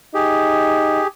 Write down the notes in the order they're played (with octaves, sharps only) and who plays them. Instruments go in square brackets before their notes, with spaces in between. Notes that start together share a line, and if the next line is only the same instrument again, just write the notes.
[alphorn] D#4 [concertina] G4 G#4